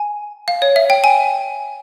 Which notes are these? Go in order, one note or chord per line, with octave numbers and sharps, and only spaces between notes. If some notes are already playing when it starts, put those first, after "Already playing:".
Already playing: G#5
F5
C#5
E5
G5
G#5